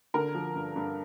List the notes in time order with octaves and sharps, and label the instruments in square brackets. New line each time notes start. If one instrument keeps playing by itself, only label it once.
[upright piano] D3 A#4
F3
G2
G2